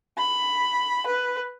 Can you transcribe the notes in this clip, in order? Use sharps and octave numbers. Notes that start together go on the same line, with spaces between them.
B5
B4